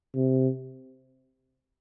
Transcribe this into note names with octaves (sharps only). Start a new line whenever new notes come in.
C3